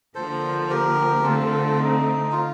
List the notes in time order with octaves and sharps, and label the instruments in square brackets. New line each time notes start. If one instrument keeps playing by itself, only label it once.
[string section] D3 F3 A#3 [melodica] A4 C5
[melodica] G4 A#4
[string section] D3 A3 C4 [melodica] F4 A4
[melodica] D#4
F4